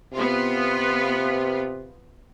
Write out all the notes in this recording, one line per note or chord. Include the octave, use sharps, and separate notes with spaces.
C3 B3 F4